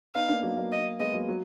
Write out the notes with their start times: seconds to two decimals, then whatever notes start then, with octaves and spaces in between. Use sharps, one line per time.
0.15 B3 D#4 F5
0.29 A#3 D4
0.43 F#3 A#3
0.57 F#3 A#3
0.72 D#5
0.99 G#3 B3 D#5
1.13 F#3 A#3
1.28 F#3